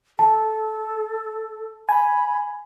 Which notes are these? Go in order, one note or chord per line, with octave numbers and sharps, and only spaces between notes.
A4 A5
G#5 B5